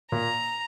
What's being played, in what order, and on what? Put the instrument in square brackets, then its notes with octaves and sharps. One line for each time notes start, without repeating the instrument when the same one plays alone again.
[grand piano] A#2 [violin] A#5